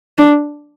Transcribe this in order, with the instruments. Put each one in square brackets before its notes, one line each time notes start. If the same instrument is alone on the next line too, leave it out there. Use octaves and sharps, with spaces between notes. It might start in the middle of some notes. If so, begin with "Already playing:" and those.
[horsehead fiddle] D4